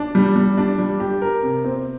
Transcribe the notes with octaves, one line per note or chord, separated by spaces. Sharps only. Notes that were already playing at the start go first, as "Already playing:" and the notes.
Already playing: D4
G3
G3
D4
G3
G4
A#4
C3
C4